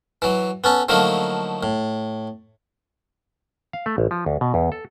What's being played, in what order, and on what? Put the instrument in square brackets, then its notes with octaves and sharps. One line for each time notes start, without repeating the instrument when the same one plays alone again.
[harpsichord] E3 F#3
B3 C#4 A4
D3 F3 F#3 A3 A#3 D#4
A2
[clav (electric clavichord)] F5
A3
A1
F3
D2
B2
E2
A4